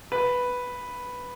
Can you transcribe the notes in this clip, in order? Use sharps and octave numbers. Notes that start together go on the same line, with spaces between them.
B4